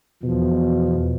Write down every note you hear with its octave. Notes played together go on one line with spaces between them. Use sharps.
E2 B2 F3